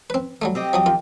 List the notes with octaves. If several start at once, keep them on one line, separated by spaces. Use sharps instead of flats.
C4 B4
F#3 G3 A3
C4 G4 D#5
F3 F#3 D#6
D#3 F4